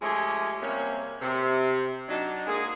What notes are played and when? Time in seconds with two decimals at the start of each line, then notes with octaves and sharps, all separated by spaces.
0.02 F3 G#3 A3 C#4 G4 G#4
0.62 C3 G3 A#3 C#4
1.21 C3
2.08 F#3 D4 D#4
2.47 G#2 G#3 A#3 G#4